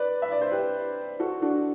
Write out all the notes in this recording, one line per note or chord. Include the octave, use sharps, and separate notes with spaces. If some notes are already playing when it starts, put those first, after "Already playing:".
Already playing: B4 D5
E5
D5
C5
G4 B4
F#4 A4
D4 F#4